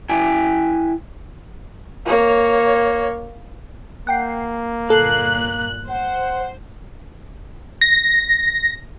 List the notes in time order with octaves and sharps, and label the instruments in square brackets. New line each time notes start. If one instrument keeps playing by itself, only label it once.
[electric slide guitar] E4 G5 G#5
[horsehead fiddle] A#3 C#5
[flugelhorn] A#3 [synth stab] F#5 G5 C7
[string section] G1 A#2 F#6 [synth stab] A4 C7
[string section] C5 [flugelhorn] F#5
[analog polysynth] A#6